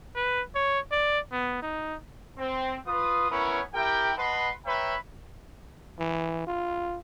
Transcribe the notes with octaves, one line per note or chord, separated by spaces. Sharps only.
B4
C#5
D5
B3
D#4
C4
F4 B4 D#6
B3 C#4 E4 A#4 B4 C#5
E4 G4 A#4 G5
B4 D#5 F#5 A5 B5 C6
B4 C#5 E5 G5 A#5 B5
E3
F4